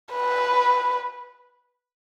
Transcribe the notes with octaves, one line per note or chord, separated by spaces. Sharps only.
B4